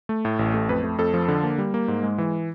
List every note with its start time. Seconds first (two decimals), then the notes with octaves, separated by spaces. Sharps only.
0.09 A3
0.25 A2
0.39 A1
0.54 A3
0.69 F2 B4
0.83 A3
0.98 F2 A4
1.14 F3
1.28 D3
1.44 A#3
1.58 G3
1.74 A#3
1.88 G#2
2.03 G#3
2.18 E3